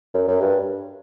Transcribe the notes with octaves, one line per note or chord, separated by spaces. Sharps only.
F#2
F#2
G2